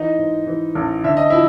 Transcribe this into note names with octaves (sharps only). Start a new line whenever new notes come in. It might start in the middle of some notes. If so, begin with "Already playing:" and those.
Already playing: E3 D#4 D#5
G#2
E3
A1
D3 E5
D#5
F3 E4 E5